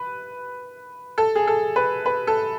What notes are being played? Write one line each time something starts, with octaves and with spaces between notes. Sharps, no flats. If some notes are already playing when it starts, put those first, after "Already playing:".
Already playing: B4
A4
G#4
A4
B4
B4
A4